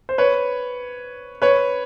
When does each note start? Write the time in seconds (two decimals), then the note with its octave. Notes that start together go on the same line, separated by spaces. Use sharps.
0.09 C5
0.18 B4 C#5
1.42 B4 C#5